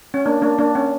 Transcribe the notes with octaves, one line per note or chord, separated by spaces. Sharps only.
C#4
A#3 D4
A#3 D4
A#3 D4
C#4